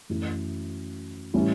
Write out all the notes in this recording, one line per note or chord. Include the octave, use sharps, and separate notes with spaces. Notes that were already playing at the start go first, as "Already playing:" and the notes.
F#2 E3 A3 E4
A2 E3 G3 C#4 E4